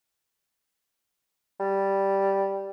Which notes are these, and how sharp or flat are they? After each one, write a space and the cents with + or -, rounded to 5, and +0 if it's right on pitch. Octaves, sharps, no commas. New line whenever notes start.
G3 -5